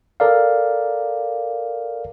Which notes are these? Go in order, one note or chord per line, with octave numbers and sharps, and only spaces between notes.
A4 A#4 D5 F5